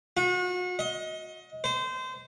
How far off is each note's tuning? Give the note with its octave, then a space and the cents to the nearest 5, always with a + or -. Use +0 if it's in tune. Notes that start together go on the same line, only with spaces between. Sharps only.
F#4 -40
D#5 +25
C5 -25